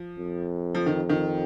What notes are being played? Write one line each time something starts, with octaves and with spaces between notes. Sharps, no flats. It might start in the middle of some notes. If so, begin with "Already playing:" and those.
Already playing: F3
F2
F3
D#3
D#3